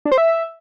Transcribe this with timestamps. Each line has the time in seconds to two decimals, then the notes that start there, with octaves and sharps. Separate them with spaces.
0.05 D4
0.12 C5
0.18 E5